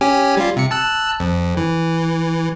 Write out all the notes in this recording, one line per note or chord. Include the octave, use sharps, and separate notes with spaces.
C#4 G4 G#5
G3 F4
C3 C#7
A5 E6 F#6
F2
E3